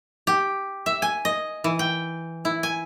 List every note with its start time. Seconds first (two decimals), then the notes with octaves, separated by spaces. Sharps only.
0.27 G4
0.86 E5
1.02 G#5
1.25 D#5
1.64 E3
1.79 G5
2.45 E4
2.63 G#5